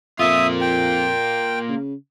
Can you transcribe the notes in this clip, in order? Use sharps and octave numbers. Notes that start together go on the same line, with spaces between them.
F2 A#3 F4 E5 D#6
G5
C#3